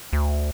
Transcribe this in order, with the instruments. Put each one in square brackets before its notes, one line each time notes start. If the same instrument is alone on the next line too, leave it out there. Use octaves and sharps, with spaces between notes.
[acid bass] D2